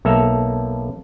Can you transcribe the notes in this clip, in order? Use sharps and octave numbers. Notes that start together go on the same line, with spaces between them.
B1 A#3 A4 E5 A#5